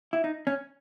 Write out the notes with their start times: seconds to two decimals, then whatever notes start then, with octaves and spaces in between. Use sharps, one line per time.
0.13 E4
0.24 D#4
0.47 C#4